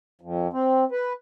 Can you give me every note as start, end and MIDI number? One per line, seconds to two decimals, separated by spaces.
0.21 0.48 41
0.53 0.84 60
0.91 1.13 71